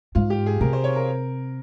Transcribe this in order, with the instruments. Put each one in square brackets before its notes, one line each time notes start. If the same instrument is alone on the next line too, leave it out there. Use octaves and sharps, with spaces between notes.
[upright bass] G#2 [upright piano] F4
[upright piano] G4
G#4
[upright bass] C3 [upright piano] A#4
[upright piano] C5
C#5
A#4